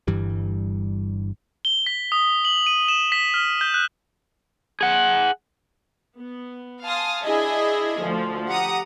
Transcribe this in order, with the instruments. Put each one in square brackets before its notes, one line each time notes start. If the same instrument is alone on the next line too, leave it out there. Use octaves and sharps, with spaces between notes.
[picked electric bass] G1 G2 E3 G3
[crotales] G7
B6
D#6
F#7
D#7
E7
B6
F6
G6
F#6
[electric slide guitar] G#4 F#5
[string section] B3
F5 G#5 A5 C6 D#6 F6
D4 E4 G#4 D#5 E5 G#5
D2 F3 A3
G4 F#5 A#5 D#6